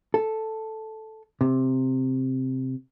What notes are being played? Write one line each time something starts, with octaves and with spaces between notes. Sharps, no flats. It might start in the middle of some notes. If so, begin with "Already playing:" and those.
A4
C3